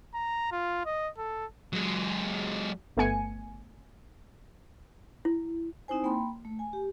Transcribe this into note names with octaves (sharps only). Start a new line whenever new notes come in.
A#5
F4
D#5
A4
F#3 G#3
G1 A3 B3 G#5 C#7
E4
C4 D#4 E4 C5 G#5
A#3 G5 B5 C6
A3
G#5
G4